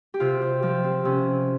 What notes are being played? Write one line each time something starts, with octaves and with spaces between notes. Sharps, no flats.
G4
C3 F4
G4
F3 G4
C4
C3 C#4